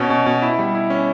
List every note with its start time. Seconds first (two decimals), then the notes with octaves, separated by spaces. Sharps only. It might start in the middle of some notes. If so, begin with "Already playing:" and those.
Already playing: B2 C#4
0.10 B2
0.26 B2
0.42 E4
0.59 G3
0.75 E4
0.90 C#4